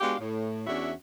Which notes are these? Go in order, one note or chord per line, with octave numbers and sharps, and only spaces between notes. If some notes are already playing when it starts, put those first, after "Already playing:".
G#3 B3 D4 F#4 G4 F5
A2
E2 C#4 D4 F#4 E5